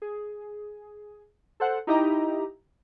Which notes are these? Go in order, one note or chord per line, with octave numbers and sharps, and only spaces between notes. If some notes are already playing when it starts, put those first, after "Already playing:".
G#4
A4 C5 F#5
D#4 E4 G4 D#5 A#5